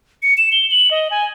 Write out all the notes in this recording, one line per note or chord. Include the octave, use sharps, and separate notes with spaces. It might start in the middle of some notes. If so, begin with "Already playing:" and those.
C#7
E7
G7
F#7
D#5
G#5